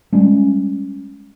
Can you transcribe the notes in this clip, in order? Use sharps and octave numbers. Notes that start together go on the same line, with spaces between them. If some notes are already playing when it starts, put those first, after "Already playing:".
G3 G#3 C#4